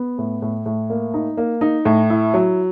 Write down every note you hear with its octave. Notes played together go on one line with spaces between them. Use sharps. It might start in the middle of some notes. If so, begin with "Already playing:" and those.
Already playing: B3
A2
A2
A2
A#3
D#4
A#3
D#4
A2
E4
F#3